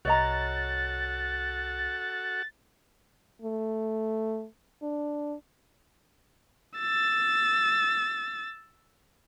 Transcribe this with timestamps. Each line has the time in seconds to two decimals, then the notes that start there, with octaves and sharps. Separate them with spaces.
0.05 C2 F#4 A4 C#5 D#5 F#5 A#5 A6
3.42 A3
4.83 D4
6.79 E6 A6